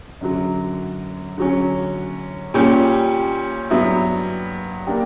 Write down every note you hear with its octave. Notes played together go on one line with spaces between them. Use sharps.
F#2 D3 F#3
D3 F#3 C#4
A#2 G3 C#4 G4
G2 F#3 B3 E4
A#3 D4 G4